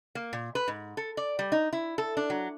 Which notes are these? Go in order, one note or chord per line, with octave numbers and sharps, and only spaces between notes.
A#3
A#2
B4
G#2
A4
D5
G3
D#4
E4
A4
D4
F#3